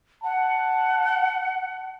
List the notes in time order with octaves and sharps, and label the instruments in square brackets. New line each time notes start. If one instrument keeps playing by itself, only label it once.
[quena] F#5 [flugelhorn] A5